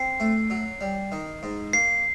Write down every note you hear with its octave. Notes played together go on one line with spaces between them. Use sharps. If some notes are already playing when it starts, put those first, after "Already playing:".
Already playing: C4 C7
A3
F#3
G3
D#3
G#2
A#3 C7